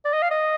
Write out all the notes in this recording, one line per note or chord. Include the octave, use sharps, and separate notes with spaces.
D5
D#5
F5
D#5